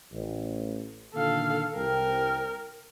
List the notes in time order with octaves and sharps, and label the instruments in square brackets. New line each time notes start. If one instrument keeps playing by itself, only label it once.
[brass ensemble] A1
[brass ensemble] A#2 D3 D#3 [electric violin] A4 F5
[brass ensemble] C2 G5 [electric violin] A#4